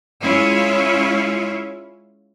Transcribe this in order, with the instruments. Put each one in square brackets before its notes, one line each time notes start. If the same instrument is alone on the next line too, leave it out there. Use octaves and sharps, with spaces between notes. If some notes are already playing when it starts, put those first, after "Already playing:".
[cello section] G#3 C#4 E4 F4